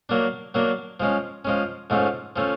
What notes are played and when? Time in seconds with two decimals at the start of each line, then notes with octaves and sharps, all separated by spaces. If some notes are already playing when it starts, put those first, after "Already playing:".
0.09 F#3 A#3 D4
0.54 F#3 A#3 D4
1.00 F3 G#3 C#4
1.45 F3 G#3 C#4
1.90 G#2 F3 A3 C#4
2.36 F3 A3 C#4